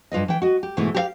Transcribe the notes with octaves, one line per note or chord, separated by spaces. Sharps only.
G2 F4 B4 D#5
E3 G5
F#4 D#5
G4
G#2 B2 E3 G#3 A3 E4
G4 B4 F5